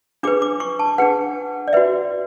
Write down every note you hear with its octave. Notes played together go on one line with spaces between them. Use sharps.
D4 G#4 B4 D6
D6
C#6
A5
D4 G#4 B4 F#5
D5
F#4 B4 E5